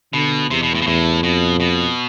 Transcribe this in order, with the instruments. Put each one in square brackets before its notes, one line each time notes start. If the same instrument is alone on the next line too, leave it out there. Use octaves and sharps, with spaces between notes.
[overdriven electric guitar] B2 [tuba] D3
[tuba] E2 [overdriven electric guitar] C3
[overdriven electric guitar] B2
A2
B2
[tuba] E2 [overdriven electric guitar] A2
[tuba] F2 [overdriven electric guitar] B2
[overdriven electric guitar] B2